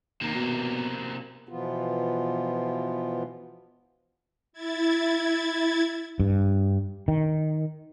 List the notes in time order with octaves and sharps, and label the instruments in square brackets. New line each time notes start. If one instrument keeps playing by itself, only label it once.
[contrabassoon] D#2 [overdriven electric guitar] C3 A#3
[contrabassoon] B2
[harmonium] B2 E3 F3 B3 F4
[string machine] E4 G#6 A6
[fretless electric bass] G2
D#3